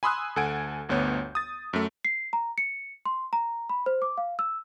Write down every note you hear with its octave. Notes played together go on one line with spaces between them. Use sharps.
G#5 B5 C6 D#6 E6 F#6
D2 A4 F#5 G#5 G#6 D7
G1 D2 B3 C#5 G6
D#6 A6
F#2 A3
C7
A#5
C#7
C6
A#5
B5
C5
D6
F5
E6